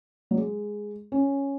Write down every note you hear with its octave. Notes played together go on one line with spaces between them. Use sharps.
F#3
G#3
C#4